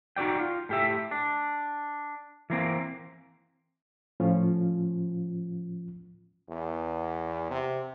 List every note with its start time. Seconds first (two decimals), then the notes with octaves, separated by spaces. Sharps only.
0.16 D#4 F#4 G4 D5 G5
0.40 F4
0.69 A2 G4 E5
1.11 D4
2.50 E3 A#3 C4
4.20 A2 F3 C#4 F4
6.49 E2
7.51 C3